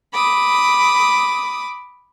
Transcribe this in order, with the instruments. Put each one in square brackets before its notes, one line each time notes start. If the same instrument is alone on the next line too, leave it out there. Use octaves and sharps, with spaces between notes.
[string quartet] B5 D6 D#6